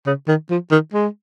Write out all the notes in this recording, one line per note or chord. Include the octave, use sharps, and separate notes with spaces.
C#3
D#3
F3
D#3
G#3